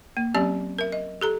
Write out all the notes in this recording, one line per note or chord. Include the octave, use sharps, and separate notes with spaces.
A#3
F#3 C4 C#4 G4 D5
A#4 E5
D#5
G4 A4 A#5